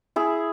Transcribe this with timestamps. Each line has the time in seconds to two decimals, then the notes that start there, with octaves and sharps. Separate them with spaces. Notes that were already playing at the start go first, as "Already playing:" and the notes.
0.16 E4 G#4